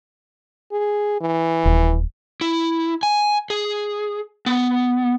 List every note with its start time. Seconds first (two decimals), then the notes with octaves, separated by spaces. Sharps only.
0.72 G#4
1.21 E3
1.65 D#1
2.41 E4
3.03 G#5
3.50 G#4
4.46 B3